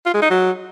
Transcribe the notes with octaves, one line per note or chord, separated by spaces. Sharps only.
F4
G#3
D#4
F#3